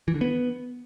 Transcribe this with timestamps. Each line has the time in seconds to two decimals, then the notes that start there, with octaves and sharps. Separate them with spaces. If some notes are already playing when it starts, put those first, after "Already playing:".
0.08 E3
0.14 D3
0.21 B3